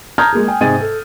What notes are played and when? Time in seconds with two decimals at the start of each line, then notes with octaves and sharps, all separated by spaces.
0.18 A5 A#5 D#6 F6 G6 G#6
0.33 G#3 A#3 G#4
0.48 G5 G#5
0.61 G#2 C3 D#5 G#5 A6 D#7
0.80 A4